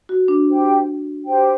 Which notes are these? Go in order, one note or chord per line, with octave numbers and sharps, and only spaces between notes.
F#4
D4
G4 C5 G5
G4 C5 G5